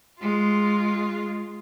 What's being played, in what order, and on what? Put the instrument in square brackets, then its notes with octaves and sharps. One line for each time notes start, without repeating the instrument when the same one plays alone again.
[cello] G#3 F4